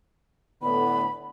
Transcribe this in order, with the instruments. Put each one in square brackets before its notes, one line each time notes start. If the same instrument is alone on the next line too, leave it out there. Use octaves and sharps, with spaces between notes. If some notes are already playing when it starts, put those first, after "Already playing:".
[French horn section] A2 D3 B3 [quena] B5